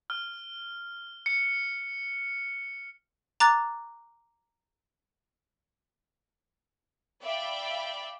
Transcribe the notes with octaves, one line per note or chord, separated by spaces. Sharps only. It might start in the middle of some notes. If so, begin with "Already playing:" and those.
F6
C#7
A#5 D6 F#6 A6
D5 E5 F5 G5 B5